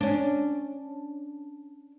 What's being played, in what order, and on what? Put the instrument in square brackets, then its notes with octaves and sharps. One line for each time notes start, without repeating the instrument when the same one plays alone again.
[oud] C#4 D4